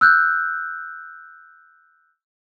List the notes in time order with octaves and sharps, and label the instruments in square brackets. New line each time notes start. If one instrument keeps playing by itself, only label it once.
[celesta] E6 F#6 G6